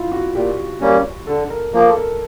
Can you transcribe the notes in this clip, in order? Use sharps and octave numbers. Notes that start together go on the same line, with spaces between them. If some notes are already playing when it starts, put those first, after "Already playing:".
Already playing: E4 F4
F#4
A#2 G4
G3 A#3 C#4
D3 A4
A#4
F3 A#3 A#4
A4
A#4